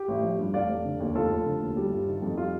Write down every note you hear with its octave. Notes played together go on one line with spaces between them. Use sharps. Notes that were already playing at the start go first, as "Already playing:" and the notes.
Already playing: G4
A1
F3
G2
F1 D5 F5
F1
D3
D#2
F1 F4 A4
F1
D3
D#2
G3
G1
D#3
F2
G3 F4